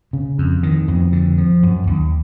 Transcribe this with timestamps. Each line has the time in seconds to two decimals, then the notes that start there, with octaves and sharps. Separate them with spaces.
0.13 C#3
0.38 F2
0.63 D#3
0.88 F2
1.13 D3
1.38 F3
1.63 F#2
1.87 D#2